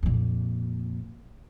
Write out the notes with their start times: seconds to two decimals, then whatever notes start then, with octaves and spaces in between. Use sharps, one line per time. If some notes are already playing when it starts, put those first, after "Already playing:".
0.03 F2 A#2